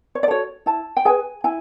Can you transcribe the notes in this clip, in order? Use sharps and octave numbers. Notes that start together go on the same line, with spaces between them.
C#5
D5
F#4 A4 C#5
E4 A5
G5
G#4 B4 G#5
E4 G#5